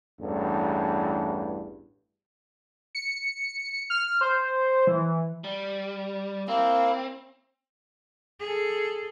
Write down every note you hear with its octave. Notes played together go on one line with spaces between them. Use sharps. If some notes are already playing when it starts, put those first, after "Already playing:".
A1 E2 G2
C#7
F6
C5
E3
G3
A#3 C4 E4
G#4 A4